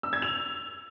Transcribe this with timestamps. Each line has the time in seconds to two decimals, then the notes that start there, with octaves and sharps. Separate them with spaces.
0.03 E6
0.13 G#6
0.22 F7